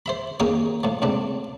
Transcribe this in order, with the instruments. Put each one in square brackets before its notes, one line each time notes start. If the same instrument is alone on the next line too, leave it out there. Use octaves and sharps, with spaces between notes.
[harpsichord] C5 E5 B5
D#2 A#3 C#4 G#4 G5 D#6
A2 F3
C#2 A2 C4 D4